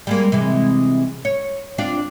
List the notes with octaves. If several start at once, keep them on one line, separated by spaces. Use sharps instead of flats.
G3 G#3 A#3
C3 E3 G#3
C#5
C4 D4 F4